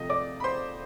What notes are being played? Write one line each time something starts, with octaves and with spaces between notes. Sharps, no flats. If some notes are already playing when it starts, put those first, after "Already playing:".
Already playing: C3 F3 A3 D#5
D5 D6
B5
C5 C6